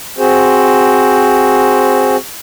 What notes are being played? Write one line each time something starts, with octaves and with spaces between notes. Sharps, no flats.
C4 F#4 G#4 C5